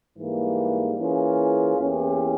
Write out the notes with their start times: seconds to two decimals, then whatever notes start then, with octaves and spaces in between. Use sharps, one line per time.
0.18 G#2 E3 G3 A#3
0.98 E3 A#3 C#4 F4 G#4
1.78 E2 E3 A#3 C#4 G4